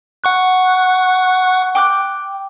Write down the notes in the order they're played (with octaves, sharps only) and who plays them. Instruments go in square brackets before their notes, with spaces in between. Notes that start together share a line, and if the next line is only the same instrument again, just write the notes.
[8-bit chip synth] F#5 C#6 F#6
[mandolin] G5 D6 F#6